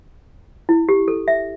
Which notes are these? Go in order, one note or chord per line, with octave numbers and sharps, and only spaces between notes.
E4
G4
A4
E5